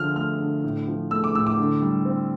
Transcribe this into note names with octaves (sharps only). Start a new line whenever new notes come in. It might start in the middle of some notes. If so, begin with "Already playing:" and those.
Already playing: D3 F3 F6
A3 F6
D3
A2
F3
A3 E6
D6
A2 E6
D6
D3
G3
C4